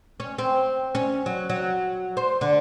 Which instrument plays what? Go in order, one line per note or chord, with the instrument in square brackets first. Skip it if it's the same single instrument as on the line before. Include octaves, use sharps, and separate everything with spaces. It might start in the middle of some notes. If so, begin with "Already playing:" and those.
[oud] C#4
C4
C#4
F#3
F#3
C5
D3